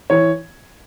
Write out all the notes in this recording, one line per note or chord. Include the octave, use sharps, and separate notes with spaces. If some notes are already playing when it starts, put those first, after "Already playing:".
E3 C#5